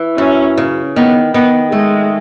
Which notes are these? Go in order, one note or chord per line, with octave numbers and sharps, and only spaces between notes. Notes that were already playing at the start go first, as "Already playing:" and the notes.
Already playing: E3
F#2 C#4
C#3
D#3 B3
D#3 B3
G#3 A3